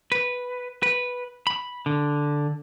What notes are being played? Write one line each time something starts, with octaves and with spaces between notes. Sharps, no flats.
B4
B4
B5
D3